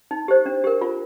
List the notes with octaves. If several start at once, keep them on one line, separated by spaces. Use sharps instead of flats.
D#4
G4 C5
D4
G4 A#4
F4